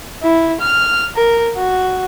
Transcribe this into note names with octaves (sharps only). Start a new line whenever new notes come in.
E4
F6
A#4
F#4